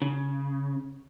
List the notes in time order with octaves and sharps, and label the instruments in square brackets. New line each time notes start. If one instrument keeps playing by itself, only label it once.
[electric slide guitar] C#3